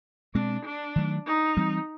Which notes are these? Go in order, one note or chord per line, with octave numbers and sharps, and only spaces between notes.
B2 G#3 C4 D4
D4
D#3 F#3 A3
D#4
E3 G3 C4